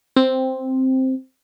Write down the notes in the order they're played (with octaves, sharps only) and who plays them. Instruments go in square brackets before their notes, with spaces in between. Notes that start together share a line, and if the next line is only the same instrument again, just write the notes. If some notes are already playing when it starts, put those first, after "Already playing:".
[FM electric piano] C4